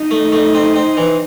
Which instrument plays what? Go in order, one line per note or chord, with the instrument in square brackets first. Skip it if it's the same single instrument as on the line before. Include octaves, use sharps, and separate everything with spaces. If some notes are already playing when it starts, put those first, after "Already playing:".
Already playing: [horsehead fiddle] D#4
[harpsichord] A3
A3
C4
C4
E3